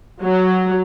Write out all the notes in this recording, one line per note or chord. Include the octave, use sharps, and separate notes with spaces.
F#3